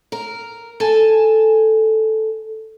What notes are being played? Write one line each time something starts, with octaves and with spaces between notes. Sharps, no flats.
A#4
A4 G#5 A5